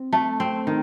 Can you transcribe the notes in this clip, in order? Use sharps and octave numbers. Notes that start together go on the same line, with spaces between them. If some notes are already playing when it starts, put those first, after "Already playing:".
Already playing: C4
A3
C4
D#3